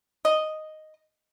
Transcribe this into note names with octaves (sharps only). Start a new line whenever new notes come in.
D#5